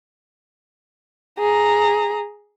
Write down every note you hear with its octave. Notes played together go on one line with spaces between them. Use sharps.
G#4 A#5